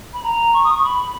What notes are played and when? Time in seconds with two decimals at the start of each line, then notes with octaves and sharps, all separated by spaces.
0.13 B5
0.23 A#5
0.53 C#6
0.64 D#6
0.74 C#6
0.84 B5